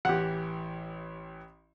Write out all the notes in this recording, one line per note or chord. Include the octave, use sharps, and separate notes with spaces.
A1 E3 G4 F#5